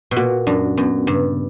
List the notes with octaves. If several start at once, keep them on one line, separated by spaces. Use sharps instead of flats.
B2
A#2 F#4
F#2 D4
F#2 B3
G2 C#3